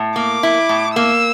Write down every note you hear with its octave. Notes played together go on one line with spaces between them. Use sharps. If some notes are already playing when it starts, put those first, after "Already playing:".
Already playing: A2
A#3 D6
E4
A2
A#3 E6